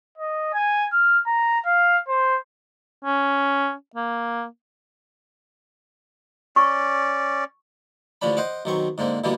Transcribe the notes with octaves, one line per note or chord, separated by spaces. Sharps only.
D#5
G#5
F6
A#5
F5
C5
C#4
A#3
C#4 D5 C#6
A1 D3 F3 C#4 D4 B5
C5 D#5 F#5 D6
B1 D#3 F#3 C4 C#6
G#2 D3 A#3 C4
B2 D3 E3 G3 A#3 B3